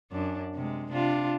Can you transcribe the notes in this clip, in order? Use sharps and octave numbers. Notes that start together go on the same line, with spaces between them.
F#2 D4
C3 G#3
C3 D4 F4